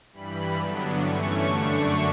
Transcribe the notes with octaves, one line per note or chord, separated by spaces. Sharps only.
G2 E3 G3 B5
G2 D3 F#3 B3 D4
G2 E3 A3 C#4 C#6
F#2 D3 A3 D4 C#6